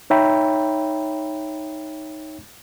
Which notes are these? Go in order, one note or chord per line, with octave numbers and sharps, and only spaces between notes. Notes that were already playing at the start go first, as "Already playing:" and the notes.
D#4 C#5 E5 G5 A#5 B5